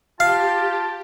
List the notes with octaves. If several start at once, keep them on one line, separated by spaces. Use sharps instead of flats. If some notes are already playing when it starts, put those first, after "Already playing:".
F4 G4 F5 A5